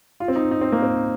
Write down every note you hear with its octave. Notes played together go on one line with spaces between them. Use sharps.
F4
C4
D#4
D#4
C4
A#3
C4